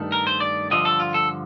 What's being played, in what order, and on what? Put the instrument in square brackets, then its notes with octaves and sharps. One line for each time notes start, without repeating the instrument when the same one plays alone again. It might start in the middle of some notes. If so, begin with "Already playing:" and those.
Already playing: [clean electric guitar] G2 D#3 A3
A#4
C5
D5
G2 D3 F3 D#5
A4
F4
A4